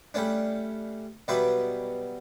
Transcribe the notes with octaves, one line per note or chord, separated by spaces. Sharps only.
G3 A3 C#4 D4
B2 F#3 G3 B4 D5 E5